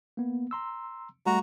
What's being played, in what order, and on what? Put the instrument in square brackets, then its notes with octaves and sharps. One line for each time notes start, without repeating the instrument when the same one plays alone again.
[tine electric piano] A#3 B3
A#5 C6 E6
[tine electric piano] G3 A3 [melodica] F#4 A#5